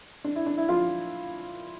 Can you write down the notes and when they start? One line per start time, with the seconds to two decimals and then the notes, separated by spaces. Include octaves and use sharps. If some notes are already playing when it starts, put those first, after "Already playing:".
0.24 D4
0.36 E4
0.46 D4
0.57 E4
0.69 F3 F4